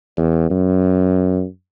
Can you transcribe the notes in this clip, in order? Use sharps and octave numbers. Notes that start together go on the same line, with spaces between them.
E2
F#2